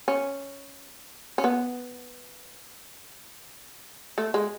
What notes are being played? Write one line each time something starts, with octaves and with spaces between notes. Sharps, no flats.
C#4
C#4
B3
A3
G#3